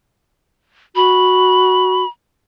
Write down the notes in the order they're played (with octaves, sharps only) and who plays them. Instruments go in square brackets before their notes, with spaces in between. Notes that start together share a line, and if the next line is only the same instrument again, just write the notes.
[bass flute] F#4 [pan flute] B5